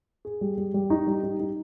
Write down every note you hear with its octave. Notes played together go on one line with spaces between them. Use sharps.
G#4
G3
G3
G3
D#4
G3
D#4
D#4